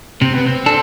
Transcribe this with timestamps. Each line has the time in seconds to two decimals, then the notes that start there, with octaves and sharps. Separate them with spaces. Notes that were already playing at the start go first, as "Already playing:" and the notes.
0.22 C3 C4
0.34 B3
0.46 C4
0.66 D4 A4